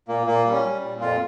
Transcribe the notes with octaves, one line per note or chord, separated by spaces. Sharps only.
A#2 A#3
A#2 A#3
G3
C#4
G3
A#2
F2 F4